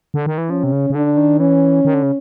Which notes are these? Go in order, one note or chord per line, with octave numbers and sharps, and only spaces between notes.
D3
D#3
E3
F3 C#4
C3
C#3
C#3
D3 D4
D#3
E3 C#4
D#3
D3
C#3